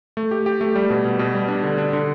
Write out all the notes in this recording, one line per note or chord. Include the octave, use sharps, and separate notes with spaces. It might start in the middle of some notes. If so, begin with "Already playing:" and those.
A3
G4
G4
A3
G3
B2
B2
B2
G3
D4
D3
D4
D3